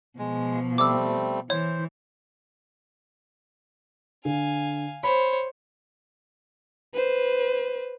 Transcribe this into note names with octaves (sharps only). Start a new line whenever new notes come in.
B2 F3 G#3
G3 A3 C4 D6 E6
E3 C5 C#5
D3 F5 G#5
C5 C#5 B5
B4 C5